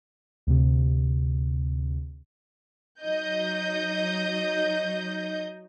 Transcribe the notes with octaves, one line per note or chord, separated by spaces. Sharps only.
D2 C3
F#3 D#4 D#5 G6